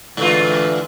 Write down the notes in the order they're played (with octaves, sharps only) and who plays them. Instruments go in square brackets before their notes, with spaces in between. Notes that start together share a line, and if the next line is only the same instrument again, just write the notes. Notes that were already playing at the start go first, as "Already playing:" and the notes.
[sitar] G#2 F4 [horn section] D3 E3